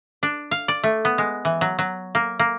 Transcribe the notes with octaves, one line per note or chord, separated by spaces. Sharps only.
D4
F5
D5
A3
B3
G#3
E3
F#3
F#3
A#3
A#3